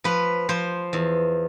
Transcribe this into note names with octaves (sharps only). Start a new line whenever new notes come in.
F3 B4
F3 C5
E2